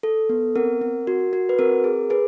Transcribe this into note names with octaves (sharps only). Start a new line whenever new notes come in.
A4
B3
C4 A#4
C4
F#4
F#4
B4
C4 A#4
G#4
G#4 B4